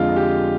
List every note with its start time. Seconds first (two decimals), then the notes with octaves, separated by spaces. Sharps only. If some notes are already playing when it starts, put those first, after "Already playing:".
Already playing: F2 D3 G#3 F4
0.16 G4